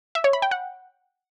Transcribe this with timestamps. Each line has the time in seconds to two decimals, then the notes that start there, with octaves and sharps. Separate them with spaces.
0.15 E5
0.24 C#5
0.33 B5
0.42 G5
0.51 F#5